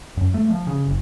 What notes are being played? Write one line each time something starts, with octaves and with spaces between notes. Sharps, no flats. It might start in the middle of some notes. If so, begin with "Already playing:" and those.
F#2
A3
F3
C#3
F#1